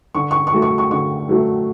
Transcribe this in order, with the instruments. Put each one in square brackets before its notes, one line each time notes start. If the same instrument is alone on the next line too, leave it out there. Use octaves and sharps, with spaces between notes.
[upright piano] D3 C#6
C#6
C#6
F#3 A3
C#6
C#6
D3 C#6
F#3 A3